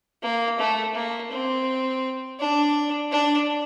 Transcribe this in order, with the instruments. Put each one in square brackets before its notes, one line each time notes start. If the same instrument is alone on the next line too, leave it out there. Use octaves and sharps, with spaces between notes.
[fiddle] A#3
A3
A#3
C4
D4
D4